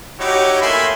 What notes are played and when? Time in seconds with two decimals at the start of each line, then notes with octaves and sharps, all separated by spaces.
0.20 D#4 E4 F#4 G4 C#5 D6
0.62 A3 A#3 E5 G#5 B5 C6